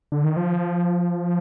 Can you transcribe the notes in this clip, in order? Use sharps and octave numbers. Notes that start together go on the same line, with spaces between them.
D3
D#3
F3